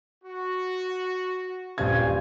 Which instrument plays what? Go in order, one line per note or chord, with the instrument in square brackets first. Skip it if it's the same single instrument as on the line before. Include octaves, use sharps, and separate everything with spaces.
[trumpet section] F#4
[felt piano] D#1 G#6 [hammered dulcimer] G2 C#5 F5 [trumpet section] C5 G#5